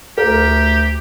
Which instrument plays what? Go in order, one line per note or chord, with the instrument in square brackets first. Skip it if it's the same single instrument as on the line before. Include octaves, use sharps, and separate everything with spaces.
[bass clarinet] D2 [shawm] G4 [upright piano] A#4